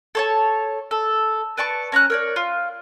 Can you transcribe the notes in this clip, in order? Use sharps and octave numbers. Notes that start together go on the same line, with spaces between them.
A4 C#5 A5
A4
B4 D5 A5 C#6
C#4 A#5 B5 F#6
A#4 C#5 D5
F4